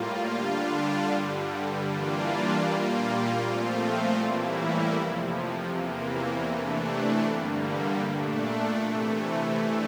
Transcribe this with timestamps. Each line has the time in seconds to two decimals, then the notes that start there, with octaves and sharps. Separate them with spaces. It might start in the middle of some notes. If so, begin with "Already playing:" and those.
Already playing: A2 G3 A#3 F4
0.31 D3 G3 D4 F4
1.08 G2 D3 G3
1.85 E3 G3 A#3 D4 F4
2.62 A#2 G3 A#3 F4
3.38 A#2 F3 A3 C4 F4
4.16 A2 E3 G3 A#3 E4
4.93 F2 C3 F3
5.69 E2 C3 E3 A#3
6.47 C3 E3 A3 D4
7.23 G2 D3 G3 A#3
8.00 A#2 A3 D4
8.77 C3 E3 A3
9.55 E2 E3 A3 D4